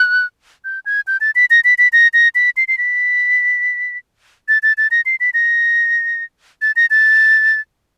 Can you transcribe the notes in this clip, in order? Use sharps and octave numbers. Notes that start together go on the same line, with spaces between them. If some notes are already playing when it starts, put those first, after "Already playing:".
Already playing: F#6
G6
G#6
G6
A6
B6
A#6
B6
B6
A#6
A#6
B6
C7
C7
B6
A6
A6
A6
A#6
C7
B6
A#6
A6
A#6
A6